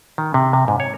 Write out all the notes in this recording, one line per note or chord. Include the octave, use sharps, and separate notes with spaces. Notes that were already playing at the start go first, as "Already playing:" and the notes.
D#3
C3
C3
G#2
C#5